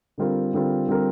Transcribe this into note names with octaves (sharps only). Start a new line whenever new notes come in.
D3 G3 C4 F4 A#4
D3 G3 C4 F4 A#4
D3 G3 C4 F4 A#4